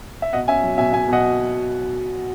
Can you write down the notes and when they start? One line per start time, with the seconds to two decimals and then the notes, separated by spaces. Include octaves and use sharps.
0.22 E5
0.33 B2 D#5 F#5
0.48 C#4 E5 G#5
0.63 F#3
0.78 B2 E5 G#5
0.93 B2 E5 G#5
1.08 B2 D#5 F#5